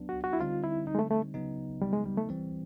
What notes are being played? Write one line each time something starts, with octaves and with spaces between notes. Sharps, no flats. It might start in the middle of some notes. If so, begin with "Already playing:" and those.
Already playing: F#3 B3 D4
F#4
F#4
E4
D3 G3 C4 D#4 F4
E4
D#4
G#3
A3
A3
C#3 F#3 B3 D#4
G3
G#3
G3
A3
E3 G3 C4